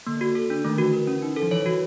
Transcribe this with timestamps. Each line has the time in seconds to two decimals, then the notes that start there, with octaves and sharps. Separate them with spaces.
0.07 D3 A#3
0.21 F#4
0.35 A4
0.50 D4
0.65 D#3 A3
0.78 E3 F#4
0.93 A#4
1.07 C#4
1.22 D#4
1.36 A4
1.42 F3
1.51 E3 C#5
1.65 E3 F#4